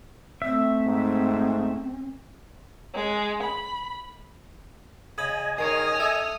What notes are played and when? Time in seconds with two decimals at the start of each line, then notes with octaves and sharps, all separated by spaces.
0.42 A3 C4 E5
0.86 G#2
2.94 G#3
3.42 B5
5.18 C#3 D#5 G#5 B5
5.58 D#3 G#4 A#4 C#5 D#6 F6
6.00 A4 E5